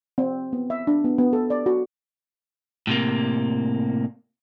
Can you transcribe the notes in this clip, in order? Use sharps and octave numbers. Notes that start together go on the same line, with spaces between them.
C4
B3
E5
D4
B3
B3
A4
D5
F#4
A2 C3 A#3